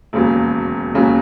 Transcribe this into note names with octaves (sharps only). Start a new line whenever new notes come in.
E1 D#2 C#3 F#3
E1 D#2 C#3 F#3